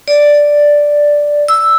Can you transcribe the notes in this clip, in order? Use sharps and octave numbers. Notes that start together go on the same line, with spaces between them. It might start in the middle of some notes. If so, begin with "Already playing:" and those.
D5
E6